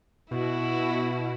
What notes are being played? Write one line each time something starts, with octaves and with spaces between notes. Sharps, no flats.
B2 E4 F#4